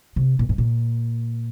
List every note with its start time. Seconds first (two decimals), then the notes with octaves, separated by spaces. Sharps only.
0.16 C3
0.39 A#2
0.49 G#2
0.58 A#2